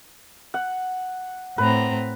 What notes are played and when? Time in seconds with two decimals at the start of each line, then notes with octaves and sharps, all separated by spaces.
0.54 F#5
1.58 A2 C4 B4 A#5